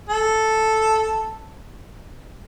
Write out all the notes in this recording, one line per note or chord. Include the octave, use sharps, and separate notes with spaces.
A4